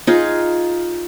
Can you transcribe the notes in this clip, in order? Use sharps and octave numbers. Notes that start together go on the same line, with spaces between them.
D#4 F4 G#4